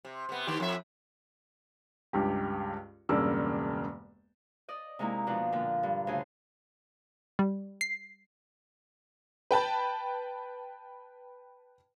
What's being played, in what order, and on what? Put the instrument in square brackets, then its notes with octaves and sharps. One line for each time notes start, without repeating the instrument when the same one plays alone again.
[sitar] C3
C3 B3
D#2 D#3 G4
F2 E5
[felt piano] C#2 G2 G4
E1 G2 C#3 A#3 D5 E6
[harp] D5 D#5
C3 G#3 A#3 D#4 E4
B2 F3 D4
A#2 D3
G2
D2 C#3 G#4
[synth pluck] G3
C7
[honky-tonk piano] B4 G5 A5 B5